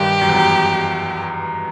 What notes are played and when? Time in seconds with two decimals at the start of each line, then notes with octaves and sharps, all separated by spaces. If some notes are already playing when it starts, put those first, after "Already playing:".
Already playing: G2 D#3 G4
0.21 F#2
0.29 E2
0.36 F#2